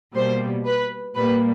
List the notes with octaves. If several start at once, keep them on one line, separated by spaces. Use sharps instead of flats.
B2 G3 A#3 C5
B4
A#2 G3 A#3 B4